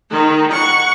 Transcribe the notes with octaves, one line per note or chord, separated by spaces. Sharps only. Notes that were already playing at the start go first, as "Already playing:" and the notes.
D#3 D#4
F#5 C#6